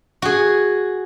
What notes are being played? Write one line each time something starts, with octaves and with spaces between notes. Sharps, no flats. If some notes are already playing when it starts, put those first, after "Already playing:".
F#4 G#4